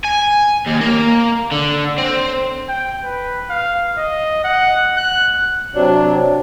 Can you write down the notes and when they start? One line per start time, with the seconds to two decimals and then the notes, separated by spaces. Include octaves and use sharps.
0.04 G#5
0.66 D#2
0.81 A#3
1.51 D3
1.98 C4
2.69 G5
3.04 B4
3.50 F5
3.98 D#5
4.45 F#5
4.97 F#6
5.74 C3 F#3 D4